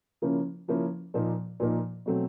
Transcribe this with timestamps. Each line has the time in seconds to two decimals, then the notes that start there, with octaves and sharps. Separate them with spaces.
0.22 C#3 F3 A#3 C#4 E4
0.68 C#3 F3 A#3 C#4 E4
1.14 A#2 F3 A#3 D#4
1.60 A#2 F3 A#3 D#4
2.06 B2 F#3 A3 C4